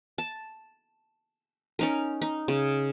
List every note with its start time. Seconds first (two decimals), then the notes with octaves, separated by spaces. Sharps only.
0.18 A5
1.79 C#4 D#4 A#4
2.22 D#4
2.48 C#3